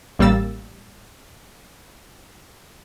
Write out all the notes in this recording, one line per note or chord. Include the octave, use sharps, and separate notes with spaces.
A1 G3 A#3 E6 A6